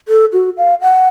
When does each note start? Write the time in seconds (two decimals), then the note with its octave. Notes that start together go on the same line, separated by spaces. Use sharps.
0.08 A4
0.33 F#4
0.57 F5
0.82 F#5